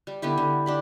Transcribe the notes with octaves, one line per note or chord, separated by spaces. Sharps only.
G3
D3 B3 E4 G4
D3
D4 G4 B5